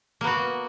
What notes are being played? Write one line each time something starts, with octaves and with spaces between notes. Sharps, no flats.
A#3 B3 F#4